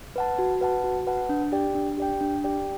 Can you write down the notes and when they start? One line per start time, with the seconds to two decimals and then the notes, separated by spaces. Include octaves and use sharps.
0.16 B4 F#5 A5
0.39 F#4
0.61 B4 F#5 A5
0.84 F#4
1.07 B4 F#5 A5
1.29 D4
1.52 G4 D5 G5
1.75 D4
1.98 G4 D5 G5
2.21 D4
2.44 G4 D5 G5